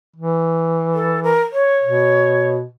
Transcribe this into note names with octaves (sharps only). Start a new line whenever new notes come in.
E3
A4
A#4
C#5
B2